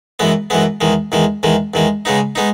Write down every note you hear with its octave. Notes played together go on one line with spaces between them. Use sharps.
F#2 E3 G#3 B3
F#2 E3 G#3 B3
E2 D#3 G#3
E2 D#3 G#3
E2 D#3 G#3
E2 D#3 G#3
C#3 G#3 B3 D#4
G#3 B3 D#4